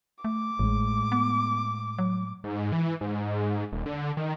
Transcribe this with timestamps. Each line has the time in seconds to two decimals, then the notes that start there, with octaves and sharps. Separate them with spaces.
0.25 A3 D6
0.59 A1 A2 G#3
1.12 B3
1.99 F#3
2.44 G#2
2.72 E3
3.01 G#2
3.72 D#1
3.86 D3
4.17 D#3